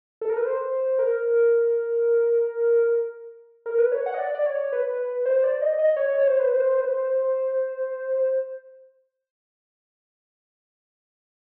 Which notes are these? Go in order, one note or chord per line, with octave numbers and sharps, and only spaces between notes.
A4
A#4
B4
C5
A#4
A#4
B4
C#5
F#5
D#5
D5
D5
C#5
B4
C5
D5
D#5
D#5
C#5
C#5
C5
B4
C5
B4
C5